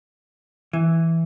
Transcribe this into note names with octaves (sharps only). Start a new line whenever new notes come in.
E3